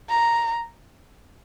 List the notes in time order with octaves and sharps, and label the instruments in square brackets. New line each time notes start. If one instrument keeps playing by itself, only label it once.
[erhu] A#5